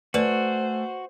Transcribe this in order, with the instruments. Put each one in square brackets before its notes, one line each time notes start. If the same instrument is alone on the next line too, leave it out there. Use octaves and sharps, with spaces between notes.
[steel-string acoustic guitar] A3 G#5 [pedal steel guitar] F#4 [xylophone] B4 D5 [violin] C5